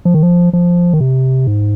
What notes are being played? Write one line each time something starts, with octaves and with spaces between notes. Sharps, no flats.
F3
D#3
F3
F3
D#3
C3
G#2